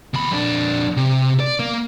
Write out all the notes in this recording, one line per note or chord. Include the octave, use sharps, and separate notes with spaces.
D#2 B5
F2 D4
C3
D5
A#3